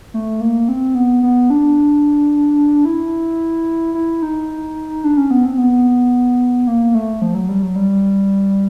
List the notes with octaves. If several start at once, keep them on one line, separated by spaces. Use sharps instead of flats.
A3
A#3
C4
B3
B3
D4
E4
E4
D#4
D4
C#4
B3
C4
B3
A#3
A3
F3
F#3
G3
F#3
G3